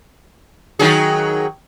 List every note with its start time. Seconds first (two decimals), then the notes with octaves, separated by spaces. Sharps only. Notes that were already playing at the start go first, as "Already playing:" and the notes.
0.79 D#3 F#3 G#4